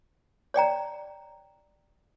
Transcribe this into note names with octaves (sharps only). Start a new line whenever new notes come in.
C#5 D5 G5 A#5